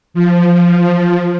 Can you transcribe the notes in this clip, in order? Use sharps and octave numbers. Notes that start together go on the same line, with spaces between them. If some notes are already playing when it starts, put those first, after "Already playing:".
F3